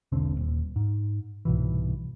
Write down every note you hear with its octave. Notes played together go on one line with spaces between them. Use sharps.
E1 B1 D3 C4
D#1
G#2
C2 G#2 B2 E3